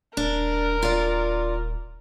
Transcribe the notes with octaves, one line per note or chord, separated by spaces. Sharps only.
D#1 D4 A#4
F4 D5